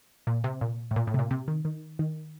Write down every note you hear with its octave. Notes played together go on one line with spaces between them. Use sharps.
A#2
C3
A#2
A2
A#2
A2
C3
A#2
C3
D#3
D#3
D#3